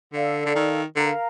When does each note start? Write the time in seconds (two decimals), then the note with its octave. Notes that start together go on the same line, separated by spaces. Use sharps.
0.12 D3 A4 D5 F5
0.46 D3
0.55 D#3
0.96 D3 A#4 F5 A#5